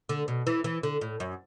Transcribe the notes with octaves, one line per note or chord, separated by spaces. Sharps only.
D3
B2
E3
E3
D3
A2
F#2